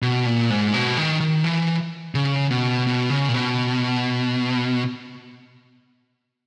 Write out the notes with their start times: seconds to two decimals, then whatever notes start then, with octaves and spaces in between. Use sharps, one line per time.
0.02 B2
0.26 A#2
0.50 G#2
0.74 B2
0.97 D#3
1.20 D#3
1.44 E3
2.15 C#3
2.51 B2
2.87 B2
3.10 C#3
3.29 A#2
3.34 B2